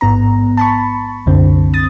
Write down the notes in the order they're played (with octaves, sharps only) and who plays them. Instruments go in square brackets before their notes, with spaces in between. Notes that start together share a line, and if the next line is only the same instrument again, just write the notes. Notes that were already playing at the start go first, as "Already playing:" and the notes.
[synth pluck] A1 G#2 B3 A#5
A5 B5 C#6
C2 F#2 D3 C4
D#6 A6